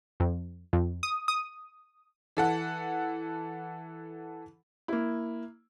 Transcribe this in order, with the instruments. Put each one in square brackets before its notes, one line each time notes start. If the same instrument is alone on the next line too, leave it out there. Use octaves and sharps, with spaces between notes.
[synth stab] F2
F2
D#6
D#6
[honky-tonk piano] E3 A4 F#5
[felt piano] A#3 E4